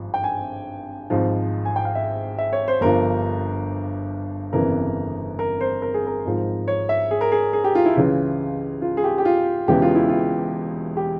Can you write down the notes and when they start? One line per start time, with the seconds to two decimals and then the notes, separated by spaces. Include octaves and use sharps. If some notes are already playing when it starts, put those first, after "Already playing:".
Already playing: G#1 G2 F3
0.14 G5
0.24 G#5
1.10 G#1 G#2 F3
1.65 G#5
1.76 G5
1.85 F5
1.95 E5
2.38 E5
2.53 C#5
2.68 C5
2.81 G1 G2 F3 A#4
4.53 G1 F2 C#3 E3 A#4
5.39 A#4
5.61 C5
5.82 A#4
5.94 G#4
6.07 A#4
6.25 G#1 G#2 F3
6.68 C#5
6.89 E5
7.11 G#4
7.21 A#4
7.32 G#4
7.53 G#4
7.64 G4
7.75 F4
7.86 E4
7.96 C#2 C#3 E3 F4
8.82 F4
8.97 G#4
9.04 G4
9.18 G4
9.25 F4
9.68 E1 E2 C#3 E3 G4
9.82 F4
9.95 E4
10.09 F4
10.97 G4